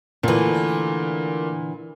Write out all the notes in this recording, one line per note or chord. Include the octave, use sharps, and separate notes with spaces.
A#2 D3 E3 A3